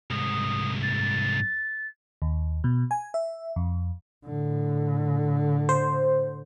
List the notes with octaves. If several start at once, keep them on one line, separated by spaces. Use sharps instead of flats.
C2 G#2 D#6
A6
D#2
B2
G#5
E5
F2
A2 D3
C5